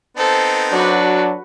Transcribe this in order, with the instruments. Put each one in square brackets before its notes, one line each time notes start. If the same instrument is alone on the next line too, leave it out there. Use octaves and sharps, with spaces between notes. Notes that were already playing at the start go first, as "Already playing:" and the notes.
[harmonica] B3 C4 D#4 [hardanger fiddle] A4 C5
[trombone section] F#3 D4 [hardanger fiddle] F#4 B4